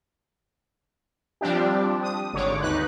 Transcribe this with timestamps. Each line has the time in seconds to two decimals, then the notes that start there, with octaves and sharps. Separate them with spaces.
1.41 F3 G3 C4 D4 G4
2.03 D#6
2.33 G#1 D3 C#5 D6
2.61 D#2 D#4 B4 F#6